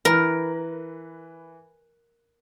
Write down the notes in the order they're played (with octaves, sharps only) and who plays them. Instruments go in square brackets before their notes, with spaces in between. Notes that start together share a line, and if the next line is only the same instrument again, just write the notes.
[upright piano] E3 B4 [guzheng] A#4